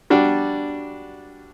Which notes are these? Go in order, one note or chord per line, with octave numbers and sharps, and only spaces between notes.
G3 D4 F#4